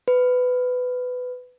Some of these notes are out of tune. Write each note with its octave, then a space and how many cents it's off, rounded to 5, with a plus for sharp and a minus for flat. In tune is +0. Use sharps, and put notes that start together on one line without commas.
B4 +15